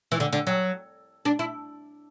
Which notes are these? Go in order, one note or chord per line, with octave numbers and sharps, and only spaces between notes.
E3
D3
D3
F#3
D4
E4